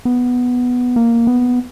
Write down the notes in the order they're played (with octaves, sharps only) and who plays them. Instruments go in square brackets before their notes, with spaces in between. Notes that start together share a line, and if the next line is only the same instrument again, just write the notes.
[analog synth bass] B3
A#3
B3